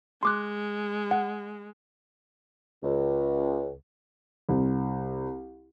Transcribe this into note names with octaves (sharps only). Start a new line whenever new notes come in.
G#3 C6 D6 F#6
F#5
C#2
C2